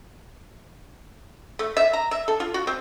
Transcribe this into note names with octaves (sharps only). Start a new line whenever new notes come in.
A3
E5
A#5
E5
A4
F4
F#4
C4